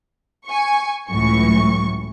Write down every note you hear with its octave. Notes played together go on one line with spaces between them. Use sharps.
G#5 C#6
C#2 A2 E3 F#3 C#6